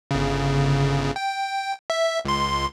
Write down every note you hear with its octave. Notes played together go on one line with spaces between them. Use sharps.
G1 C#3
G5
E5
C#2 C6